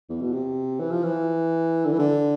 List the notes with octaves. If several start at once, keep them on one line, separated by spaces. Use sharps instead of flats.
E2
B2
C3
E3
F3
E3
D3
E3
D3